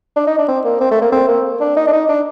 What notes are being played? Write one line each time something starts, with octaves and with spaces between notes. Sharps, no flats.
D4
D#4
D4
C4
A#3
C4
A3
A#3
C4
A#3
D4
D#4
D4
D#4
D4